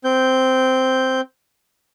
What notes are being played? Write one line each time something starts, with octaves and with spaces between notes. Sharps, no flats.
C4 G6